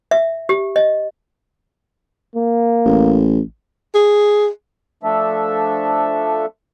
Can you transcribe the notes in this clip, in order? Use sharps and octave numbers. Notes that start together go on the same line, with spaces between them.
E5
G4
D#5
A#3
A1
G#4
F3 A3 D4 A4 E5